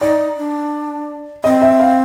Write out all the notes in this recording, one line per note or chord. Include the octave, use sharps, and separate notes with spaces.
D#4 D5
D4
C4 D#5
E5
F5